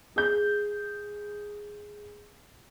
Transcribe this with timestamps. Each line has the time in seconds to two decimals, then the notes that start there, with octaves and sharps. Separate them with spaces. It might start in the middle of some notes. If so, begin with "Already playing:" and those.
0.16 G#4 G6